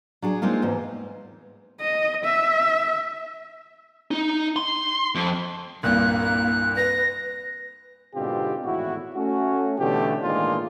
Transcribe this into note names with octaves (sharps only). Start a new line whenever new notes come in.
F#3 D4 G#4
G#3 A#3 C4 D#4 F4
E2 G#2
D#5
E5
D#4
C6
F2
C2 G2 A#2 A#3 F#6
B4 A#6
G#2 B2 D3 C4 F4 G4
G#1 E2 A2 E4 F#4
A3 C#4 F#4
B2 D3 E3 A3 C#4 G4
A1 D#3 G#3 A#3 D4 F4